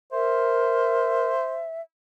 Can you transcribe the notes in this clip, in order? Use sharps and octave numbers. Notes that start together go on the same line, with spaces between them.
A#4 C5 E5